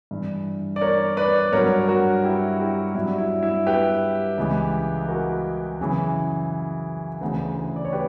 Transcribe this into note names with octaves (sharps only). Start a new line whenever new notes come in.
G2 E3
D5
A#4 C#5
B4 D5
G2 F#3 A#4 C#5
F#4 A#4
E4 G4
E4 G4
G2 F#3 E4
E4
E4
G4 B4
C#2 C#3 E3
F#4 A#4
F#2 C#3 E3
D2 C#3 E3
D5
C#5
G4 B4